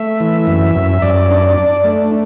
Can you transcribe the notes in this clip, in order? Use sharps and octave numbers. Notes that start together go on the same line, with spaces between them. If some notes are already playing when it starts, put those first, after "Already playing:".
Already playing: A3 E5
E3
F#2
F#2
F#2 D5
D4
D4
A3